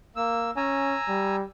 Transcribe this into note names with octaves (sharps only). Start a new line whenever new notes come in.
A#3 E6
C#4 G#5 A#5 E6
G3